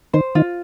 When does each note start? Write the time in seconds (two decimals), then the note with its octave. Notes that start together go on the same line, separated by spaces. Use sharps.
0.13 D#3 C5
0.35 D#3 F4